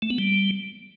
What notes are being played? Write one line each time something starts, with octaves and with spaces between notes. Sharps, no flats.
A3
B3
G3